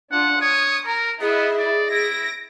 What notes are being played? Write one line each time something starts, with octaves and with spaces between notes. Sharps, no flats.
D4 F4 F#5
C#5 D#6
A#4 A#5
B3 E4 G#4 D#5 E5
D5
E4 A#6 D7